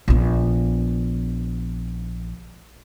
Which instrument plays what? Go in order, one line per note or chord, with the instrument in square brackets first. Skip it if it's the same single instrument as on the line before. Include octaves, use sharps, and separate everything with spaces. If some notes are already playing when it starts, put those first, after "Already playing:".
[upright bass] A#1 B3